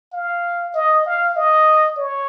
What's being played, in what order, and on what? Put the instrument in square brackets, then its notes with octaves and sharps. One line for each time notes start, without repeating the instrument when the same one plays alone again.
[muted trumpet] F5
D#5
F5
D#5
C#5